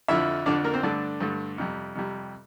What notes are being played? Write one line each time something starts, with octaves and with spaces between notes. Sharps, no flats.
F2 D3 F3 E4 E5
F2 D3 F3 D4 D5
A#3 A#4
C4 C5
G2 D3 A3 D4 D5
G2 D3 A3
F2 C3 G3
F2 C3 G3